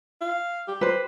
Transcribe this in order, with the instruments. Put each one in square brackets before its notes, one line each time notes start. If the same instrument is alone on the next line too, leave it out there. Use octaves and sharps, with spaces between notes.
[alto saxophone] F5
G4
[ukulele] B4 C5